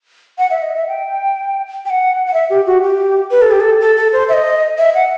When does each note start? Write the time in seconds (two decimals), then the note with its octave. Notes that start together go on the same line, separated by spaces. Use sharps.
0.38 F#5
0.51 E5
0.62 D#5
0.75 E5
0.88 G5
1.85 G5
1.90 F#5
2.26 F#5
2.34 E5
2.50 G4
2.66 F#4
2.82 G4
3.31 B4
3.42 A4
3.51 G4
3.60 A4
3.80 A4
3.96 A4
4.13 C5
4.29 E5
4.33 D#5
4.78 E5
4.94 F#5